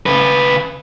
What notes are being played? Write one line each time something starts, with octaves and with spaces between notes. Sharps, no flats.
C#3 B4